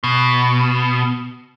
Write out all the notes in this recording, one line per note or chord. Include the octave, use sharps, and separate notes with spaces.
B2